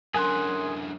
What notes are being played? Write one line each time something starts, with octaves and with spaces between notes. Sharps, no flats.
F#2 D3 G#4 A#4 G#5 C6 F#6